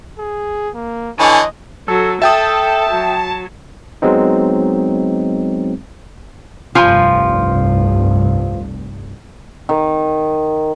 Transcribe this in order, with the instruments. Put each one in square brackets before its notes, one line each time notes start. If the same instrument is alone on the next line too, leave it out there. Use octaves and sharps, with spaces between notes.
[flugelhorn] G#4
A#3
[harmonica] D3 E3 C#5 [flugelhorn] D#5 [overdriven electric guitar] G#5
[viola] F#3 [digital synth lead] A4
[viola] A4 [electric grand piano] E5 G5 D#6 [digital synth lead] A5
[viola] F#3
[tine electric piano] F#3 G#3 B3 C4 D#4
[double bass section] F1 C2 G2 [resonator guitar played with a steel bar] F3 F4 G#5
[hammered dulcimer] D#3